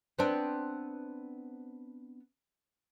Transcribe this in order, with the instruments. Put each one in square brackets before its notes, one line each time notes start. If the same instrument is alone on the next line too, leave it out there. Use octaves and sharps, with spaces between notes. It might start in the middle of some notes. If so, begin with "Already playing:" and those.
[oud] B3 C4 D4